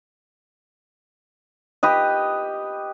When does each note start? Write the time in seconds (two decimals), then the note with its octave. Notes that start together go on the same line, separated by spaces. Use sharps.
1.83 G4 B4 D#5